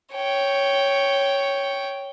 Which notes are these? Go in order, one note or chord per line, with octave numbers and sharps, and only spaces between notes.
C#5 G5